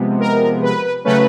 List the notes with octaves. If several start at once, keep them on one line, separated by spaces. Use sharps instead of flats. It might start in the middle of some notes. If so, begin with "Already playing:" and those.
Already playing: C3 F3 G#3 B3
A#4
B4
C#3 F#3 A3 C#4 B4